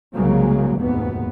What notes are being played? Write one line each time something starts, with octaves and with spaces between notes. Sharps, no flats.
C2 C#3 F#3 G#3 A#3
F1 D#2 G#2 B2 B3